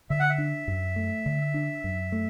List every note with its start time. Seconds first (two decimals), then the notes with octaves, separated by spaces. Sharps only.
0.10 D3 E5
0.20 F#5
0.30 E5
0.38 D4
0.68 F#2
0.96 A3
1.26 D3
1.54 D4
1.84 F#2
2.12 A3